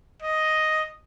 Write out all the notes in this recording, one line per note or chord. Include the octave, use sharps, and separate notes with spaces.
D#5